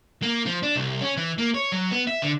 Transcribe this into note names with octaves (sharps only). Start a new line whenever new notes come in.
A#3
F3
D4
C2
C#4
E3
A#3
C#5
F#3
B3
E5
D3